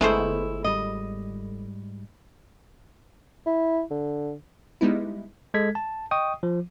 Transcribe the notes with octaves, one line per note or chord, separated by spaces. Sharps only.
G1 G#3 A3 B3 E4 C5
G#2 G3 D#5
E4
D3
G3 G#3 B3 D#4 E4
G#3 A4 G#6 B6
A5
D#5 G5 C#6 D#6
F3